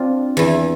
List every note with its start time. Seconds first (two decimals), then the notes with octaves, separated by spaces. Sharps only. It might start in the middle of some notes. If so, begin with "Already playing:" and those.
Already playing: C4 D4 F4
0.37 E2 E3